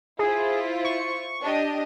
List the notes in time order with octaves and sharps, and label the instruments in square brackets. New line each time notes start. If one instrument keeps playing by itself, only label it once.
[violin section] E4 F4 C5 [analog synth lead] G#4
[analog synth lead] C#6
[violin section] D4 G4 D#5